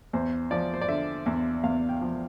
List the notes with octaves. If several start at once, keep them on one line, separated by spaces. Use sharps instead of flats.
E2 C5
F3 D5
C5
D5
D3 E5
E2 E5
E2 F5
G5
F3